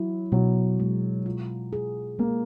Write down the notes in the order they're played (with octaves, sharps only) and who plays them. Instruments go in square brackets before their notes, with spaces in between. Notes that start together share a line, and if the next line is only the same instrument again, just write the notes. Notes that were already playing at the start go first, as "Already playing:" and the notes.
Already playing: [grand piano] F#3 [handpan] E4
[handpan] B2 [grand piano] F#3
[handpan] G#3
F4
G#4
[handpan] G#3 [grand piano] A#3